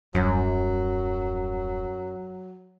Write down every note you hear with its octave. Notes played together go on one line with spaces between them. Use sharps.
D#1 F#2 F#3 G3